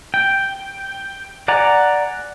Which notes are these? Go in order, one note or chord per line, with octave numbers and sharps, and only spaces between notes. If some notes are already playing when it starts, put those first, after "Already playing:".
G5
D5 F#5 G#5 A#5